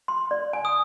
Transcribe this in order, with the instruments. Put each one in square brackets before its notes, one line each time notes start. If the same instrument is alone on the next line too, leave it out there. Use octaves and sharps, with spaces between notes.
[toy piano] C6
D5
G#5
[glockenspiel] D#6